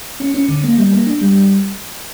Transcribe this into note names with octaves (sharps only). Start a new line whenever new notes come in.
C#4
C#4
D3
A#3
G3
A#3
D4
G3